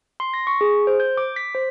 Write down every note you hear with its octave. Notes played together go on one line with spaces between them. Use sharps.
C6
A#6
C#6
G#4
C5
G6
D6
B6
C5